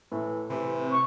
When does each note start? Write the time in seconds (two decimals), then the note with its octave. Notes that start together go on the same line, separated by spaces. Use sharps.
0.12 A2 E3
0.50 C3 E3
0.91 C#6